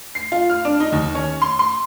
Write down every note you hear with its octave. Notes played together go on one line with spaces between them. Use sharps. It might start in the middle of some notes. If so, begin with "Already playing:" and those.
C7
F4
F6
D4
D#4
D#2
C#4
C6
C6